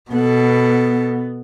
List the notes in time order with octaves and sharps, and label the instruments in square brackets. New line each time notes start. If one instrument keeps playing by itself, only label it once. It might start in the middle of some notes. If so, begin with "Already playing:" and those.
[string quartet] B2 A4 [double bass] B3